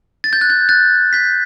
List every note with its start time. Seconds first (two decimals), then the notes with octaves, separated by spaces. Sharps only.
0.24 A6
0.33 G6
0.41 F#6
0.50 G6
0.69 F#6 A6
1.13 G6 B6